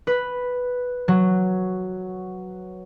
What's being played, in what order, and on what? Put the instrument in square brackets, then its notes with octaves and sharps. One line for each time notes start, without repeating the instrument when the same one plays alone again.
[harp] B4
F#3